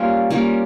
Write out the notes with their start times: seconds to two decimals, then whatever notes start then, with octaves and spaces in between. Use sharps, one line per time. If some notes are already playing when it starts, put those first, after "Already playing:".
Already playing: G3 A#3 C#4 F4
0.30 G3 A#3 C#4 F4